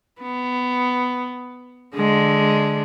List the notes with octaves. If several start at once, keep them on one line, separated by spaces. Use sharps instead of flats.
B3
D3 G#3